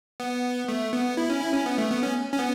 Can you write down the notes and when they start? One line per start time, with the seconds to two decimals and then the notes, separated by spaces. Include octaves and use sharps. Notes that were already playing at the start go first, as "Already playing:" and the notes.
0.20 B3
0.68 A3
0.93 B3
1.17 E4
1.30 C#4
1.41 E4
1.54 C#4
1.66 B3
1.78 A3
1.90 B3
2.03 C#4
2.33 C#4
2.39 B3